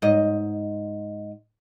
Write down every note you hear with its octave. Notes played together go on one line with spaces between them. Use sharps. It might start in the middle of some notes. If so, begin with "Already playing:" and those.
G#2 D#5